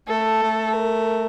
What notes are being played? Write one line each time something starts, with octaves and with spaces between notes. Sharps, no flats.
A3 A4
A3
A#4